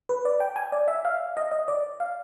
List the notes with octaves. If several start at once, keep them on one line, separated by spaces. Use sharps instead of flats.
B4
D5
G5
G#5
D5
E5
F5
D#5
D#5
D5
F5